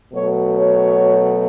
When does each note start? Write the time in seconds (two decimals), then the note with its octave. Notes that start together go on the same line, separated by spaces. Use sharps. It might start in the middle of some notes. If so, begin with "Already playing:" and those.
0.13 B2 F#3 A3 C#5
0.58 C#5